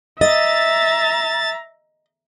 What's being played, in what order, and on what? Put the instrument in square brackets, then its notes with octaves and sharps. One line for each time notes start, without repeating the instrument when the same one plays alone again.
[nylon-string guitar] D#5 [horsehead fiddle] E5 A#5 [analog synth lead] A6